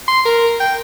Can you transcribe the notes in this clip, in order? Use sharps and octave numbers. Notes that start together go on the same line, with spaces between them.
C6
A#4
G5